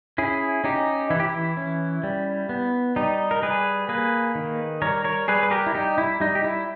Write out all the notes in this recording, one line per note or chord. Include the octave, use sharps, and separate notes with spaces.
C#4 E4 G#4
C#4 D#4 G4
E3 E4
G4
E4
C#4
G3
B3
G3 D#4
A#4
G3 G#4 B4
A#3 G#4 B4
D#3
G3 A#4 C#5
A#4 C#5
G3 G#4 B4
B4
G4 A#4
E4
G3 D#4 G4
E4
G3 D#4
G4
E4